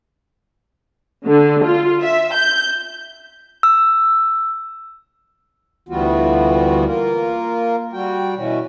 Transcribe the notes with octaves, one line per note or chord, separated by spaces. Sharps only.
D3
F4
E5
G6
E6
D2 E3 G3 B3 F4 F#4
A#3 F4 A#4
G3 F#4 G5
B2 E3 C#4 F#4